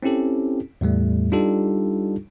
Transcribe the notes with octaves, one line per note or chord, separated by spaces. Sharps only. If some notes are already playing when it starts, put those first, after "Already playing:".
C4 C#4 E4 G4 A4
E2 A2 G3 A3
G3 D4 D#4 F4 G4 A4